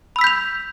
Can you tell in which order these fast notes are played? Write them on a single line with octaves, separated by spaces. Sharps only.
B5 E6 B6 G6 F7